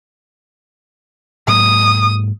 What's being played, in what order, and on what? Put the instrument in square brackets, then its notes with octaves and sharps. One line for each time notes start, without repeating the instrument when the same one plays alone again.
[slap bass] G#2 F#3 A#3 [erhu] D#6